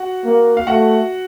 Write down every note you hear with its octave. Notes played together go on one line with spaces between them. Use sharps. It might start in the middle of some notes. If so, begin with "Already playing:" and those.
Already playing: F#4 F#5
A#3
F5
A3 F#4 F#5